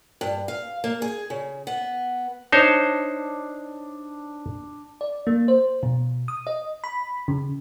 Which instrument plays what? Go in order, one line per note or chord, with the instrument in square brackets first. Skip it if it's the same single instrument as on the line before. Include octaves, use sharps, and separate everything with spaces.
[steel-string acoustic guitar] G2
F5
A#3
G#4
C#3
B3
[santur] D4 [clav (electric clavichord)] D#4 C5 C#5
[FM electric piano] D5
A#3
C5
B2
D#6
D#5
B5
C#3